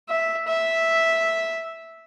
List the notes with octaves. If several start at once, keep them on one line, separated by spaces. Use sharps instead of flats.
E5
E5